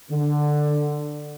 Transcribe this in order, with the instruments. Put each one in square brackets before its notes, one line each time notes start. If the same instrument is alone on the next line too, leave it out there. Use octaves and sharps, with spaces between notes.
[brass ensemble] D3